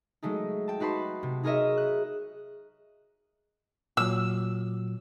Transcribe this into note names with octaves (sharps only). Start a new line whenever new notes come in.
F#3 G#3 A3 D#4
G5 A5
D#4 F#4 B4 A5 C6
C3
D#4 G#4 A#4 C#5 D#5 E5
F#6
A#2 F#3 E6